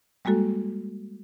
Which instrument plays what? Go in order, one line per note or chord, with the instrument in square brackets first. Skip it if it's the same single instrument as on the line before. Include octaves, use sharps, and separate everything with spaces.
[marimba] G3 G#3 A#3 F#4 A4